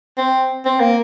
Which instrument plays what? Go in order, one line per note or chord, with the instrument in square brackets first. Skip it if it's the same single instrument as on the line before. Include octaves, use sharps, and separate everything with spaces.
[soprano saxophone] C4
C4
A#3